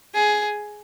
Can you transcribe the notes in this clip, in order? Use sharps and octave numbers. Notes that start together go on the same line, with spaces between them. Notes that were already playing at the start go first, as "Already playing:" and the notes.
G#4